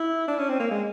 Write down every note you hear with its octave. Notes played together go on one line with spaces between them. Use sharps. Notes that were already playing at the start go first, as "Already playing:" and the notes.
Already playing: E4
D4
C#4
C4
A#3
G#3